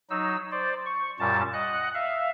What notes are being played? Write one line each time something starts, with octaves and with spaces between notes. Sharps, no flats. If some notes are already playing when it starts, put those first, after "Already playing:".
F#3 D#4 E6
C5 D5
C#6
F#2 A#2 G3 A5
D#5 F#5 F#6
E5 F5